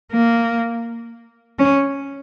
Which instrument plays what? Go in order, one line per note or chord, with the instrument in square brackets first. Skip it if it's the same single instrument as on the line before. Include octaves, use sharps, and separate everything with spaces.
[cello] A#3
C#4